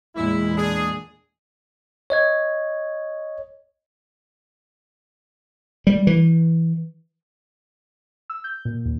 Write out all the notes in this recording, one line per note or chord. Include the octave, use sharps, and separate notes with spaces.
E2 A#2 G#3 E4
D4 G#4
C#5 D#5 G#6
G3
E3
E6
G6
A#2
D#2